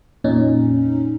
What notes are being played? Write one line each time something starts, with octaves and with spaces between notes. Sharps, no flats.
F2 A#2 C#4 D#4